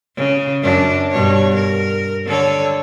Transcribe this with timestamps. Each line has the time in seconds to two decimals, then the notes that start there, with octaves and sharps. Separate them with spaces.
0.16 C#3
0.63 F#2 D4
1.11 G2 B2 C#5
1.56 A#4
2.26 D3 A4 C#5